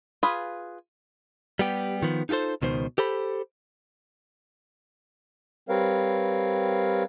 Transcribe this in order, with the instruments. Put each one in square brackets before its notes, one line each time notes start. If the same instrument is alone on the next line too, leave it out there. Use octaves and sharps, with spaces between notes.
[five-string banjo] F4 G#4 B4 B5
[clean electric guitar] G3 B3 G4
D#3 F3 B3
D#4 F4 G4 A4 C5
C#2 B2 D#3 C5
G4 A4 C5 B5
[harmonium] G3 C4 A#4 B4 C#5 F5